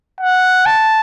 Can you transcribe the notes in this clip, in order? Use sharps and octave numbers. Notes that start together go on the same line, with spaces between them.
F#5
A5